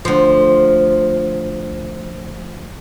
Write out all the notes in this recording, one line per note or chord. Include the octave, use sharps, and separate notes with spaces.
D2 F3